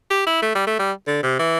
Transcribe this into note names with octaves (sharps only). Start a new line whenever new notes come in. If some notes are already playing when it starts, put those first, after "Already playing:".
G4
E4
A3
G3
A3
G3
D3
C3
E3